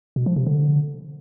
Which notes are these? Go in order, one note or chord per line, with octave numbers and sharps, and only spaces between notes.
B2
F3
C3
D3